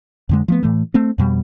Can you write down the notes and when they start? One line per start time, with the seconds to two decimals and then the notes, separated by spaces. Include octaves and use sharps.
0.29 F2 D3 G#3
0.48 F3 A3 B3
0.63 A2 E3 A3
0.94 A3 C4
1.18 F2 B2 G3